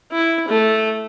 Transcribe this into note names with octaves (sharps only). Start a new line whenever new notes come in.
E4
A3